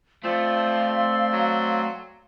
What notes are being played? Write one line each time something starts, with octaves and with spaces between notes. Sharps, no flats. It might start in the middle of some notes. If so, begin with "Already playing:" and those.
F3 A3 C4 D5 F5 C6
F#3